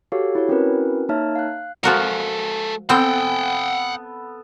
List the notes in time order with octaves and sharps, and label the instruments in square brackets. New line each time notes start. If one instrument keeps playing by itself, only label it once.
[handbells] F#4 G4 A4 C#5 F5
E4 F#4 C#5
C4 C#4 E4 F#4 A#4 B4
A#3 D#4 C#5 E5 A5 F6
F5 F#6
[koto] F3 F#4 A#4 [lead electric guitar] G#3 A4
[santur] B3 A4 [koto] C4 C5 [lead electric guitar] F#5 G5